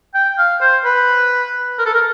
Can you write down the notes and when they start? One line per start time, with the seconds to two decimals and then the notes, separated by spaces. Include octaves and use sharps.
0.14 G5
0.38 F5
0.61 C5
0.85 B4
1.79 A#4
1.86 A4
1.94 A#4